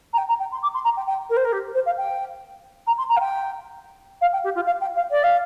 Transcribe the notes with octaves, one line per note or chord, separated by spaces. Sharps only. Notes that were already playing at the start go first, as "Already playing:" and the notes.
A#5
G5
A#5
G5
C6
D6
C6
A#5
G5
G5
A#4
C5
A#4
G4
C5
F5
G5
A#5
C6
A#5
F5
G5
F5
G5
G4
F4
F5
G5
F5
D5
F5